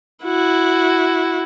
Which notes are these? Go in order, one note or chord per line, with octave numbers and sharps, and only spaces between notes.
E4 F#4